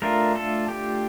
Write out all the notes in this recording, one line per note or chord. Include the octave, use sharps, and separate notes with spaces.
A3 D4 F4 A#4
A4
G4